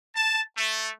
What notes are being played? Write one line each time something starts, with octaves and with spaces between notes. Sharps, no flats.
A5
A3